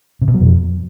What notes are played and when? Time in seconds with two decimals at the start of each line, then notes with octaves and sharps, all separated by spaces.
0.22 C3
0.28 B2
0.34 F#3
0.41 F2